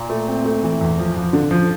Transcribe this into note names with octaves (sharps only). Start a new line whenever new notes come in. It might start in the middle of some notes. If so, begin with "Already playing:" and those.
Already playing: A#2
A3
C4
A3
E3
E2
F3
F3
D3
F3